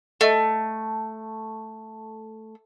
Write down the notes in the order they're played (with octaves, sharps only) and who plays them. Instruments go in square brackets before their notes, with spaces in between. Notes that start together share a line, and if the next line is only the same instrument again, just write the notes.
[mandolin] A3 [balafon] A4 D#5 E5